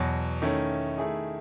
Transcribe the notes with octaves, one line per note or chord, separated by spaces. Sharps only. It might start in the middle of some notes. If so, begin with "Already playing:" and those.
Already playing: E2 B2 F#3
D#3 A3 C#4 E4
D#3 A3 E4 G#4